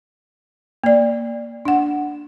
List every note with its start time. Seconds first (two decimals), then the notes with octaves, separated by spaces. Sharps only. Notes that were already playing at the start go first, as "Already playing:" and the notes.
0.84 A#3 D5
1.65 D4 F#5